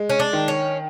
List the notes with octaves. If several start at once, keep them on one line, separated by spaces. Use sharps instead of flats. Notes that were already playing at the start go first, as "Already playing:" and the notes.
Already playing: G#3
C#4
D4
D#3
C#4